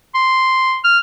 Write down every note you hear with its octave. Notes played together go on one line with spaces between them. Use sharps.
C6
F6